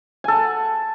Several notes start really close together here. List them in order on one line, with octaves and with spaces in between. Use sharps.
G#5 A4 F#5